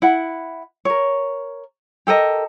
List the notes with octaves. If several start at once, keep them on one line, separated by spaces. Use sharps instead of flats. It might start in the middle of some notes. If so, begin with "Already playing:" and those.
E4 F#5
A#4 C#5
G4 A4 A#4 D#5